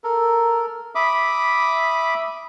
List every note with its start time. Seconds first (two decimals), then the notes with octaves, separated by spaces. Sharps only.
0.04 A4 A#4
0.95 E5 B5 D6 D#6